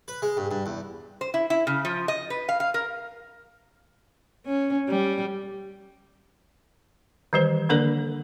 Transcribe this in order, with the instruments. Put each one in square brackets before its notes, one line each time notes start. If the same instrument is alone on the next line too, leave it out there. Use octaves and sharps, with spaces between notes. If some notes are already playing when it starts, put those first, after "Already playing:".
[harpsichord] B4
G#3
G2
G2
E2
[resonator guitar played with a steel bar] C5
E4
E4
C#3
F3
D#5
B4
F5
F5
A#4
[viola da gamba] C#4
G3
[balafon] D#3 E3 G3 G4 C5
D3 A#3 D4 A4 A#4 D5